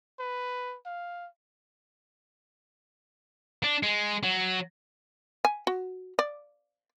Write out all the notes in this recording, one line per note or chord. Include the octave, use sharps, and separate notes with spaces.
B4
F5
D4
G#3
F#3
G#5
F#4
D5